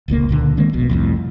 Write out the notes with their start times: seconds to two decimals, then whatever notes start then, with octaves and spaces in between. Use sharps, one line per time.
0.08 D#1 C#2 D#3 A#3
0.29 C#2 A#2 D3
0.57 D#3 G#3 A#3 C4
0.73 D#1 A#1 B2
0.90 C2 F2 A2